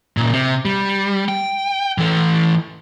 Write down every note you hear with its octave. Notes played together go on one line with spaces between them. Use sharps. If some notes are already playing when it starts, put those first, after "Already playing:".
A#2 C#3
C3
G3
G5
E3 A4